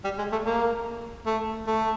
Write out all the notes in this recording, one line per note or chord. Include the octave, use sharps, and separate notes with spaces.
G3
G#3
A3
A#3
A3
A3